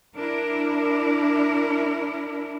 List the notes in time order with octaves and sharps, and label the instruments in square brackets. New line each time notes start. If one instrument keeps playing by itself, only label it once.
[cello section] D4 E4 A#4